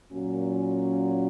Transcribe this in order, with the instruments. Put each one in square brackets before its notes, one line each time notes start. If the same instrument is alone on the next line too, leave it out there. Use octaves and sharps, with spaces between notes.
[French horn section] A#2 F#3 A#3 C#4 F#4